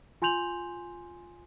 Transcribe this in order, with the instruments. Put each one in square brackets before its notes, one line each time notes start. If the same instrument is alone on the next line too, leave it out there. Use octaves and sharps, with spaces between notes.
[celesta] F4 G#5 C6 G6 F7 F#7